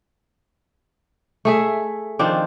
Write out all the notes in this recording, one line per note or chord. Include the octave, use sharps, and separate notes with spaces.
A3 G#4 E5
D#3 F3 C4 D4